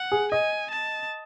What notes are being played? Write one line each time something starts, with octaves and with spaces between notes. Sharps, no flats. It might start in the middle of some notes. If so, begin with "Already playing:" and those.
Already playing: F#5
G#4
D#5 G#5
A5